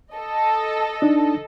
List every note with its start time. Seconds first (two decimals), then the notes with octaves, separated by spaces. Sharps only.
0.14 A4 D#5
1.02 D4 D#4